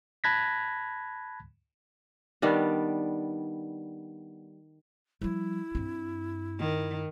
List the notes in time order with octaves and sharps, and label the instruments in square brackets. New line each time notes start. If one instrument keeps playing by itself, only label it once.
[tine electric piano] A5 B5 F#6 G#6 A#6 B6
[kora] D#3 G3 B3 D4
[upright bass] F3 G3 [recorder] E4
[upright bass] G2 C4
[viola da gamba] D#3